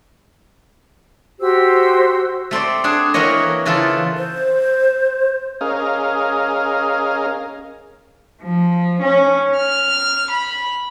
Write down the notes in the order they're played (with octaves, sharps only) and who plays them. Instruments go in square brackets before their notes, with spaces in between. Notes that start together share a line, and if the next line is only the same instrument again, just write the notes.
[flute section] F#4 G4 C5 E6
[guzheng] A3 C4 C5 D5
D4 G#4 F#5
E3 A#3 F#4 A#4 C#5 D#5
C#3 E3 A#3 F4 A4
[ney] C5
[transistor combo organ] C#4 G#4 A#4 D#5 F5
[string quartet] F3
C#4
F6
B5